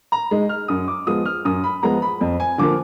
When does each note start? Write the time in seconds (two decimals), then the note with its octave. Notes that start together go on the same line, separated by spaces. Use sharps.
0.12 A#5
0.31 G#3 D#4
0.49 F6
0.68 F#2 D#6
0.88 D6
1.07 F3 G#3 B3 F4 D#6
1.25 F6
1.45 F#2 D#6
1.64 B5
1.83 F3 G#3 B3 A#5
2.02 B5
2.21 F2
2.40 G#5
2.58 D3 F3 A#3 F4 D6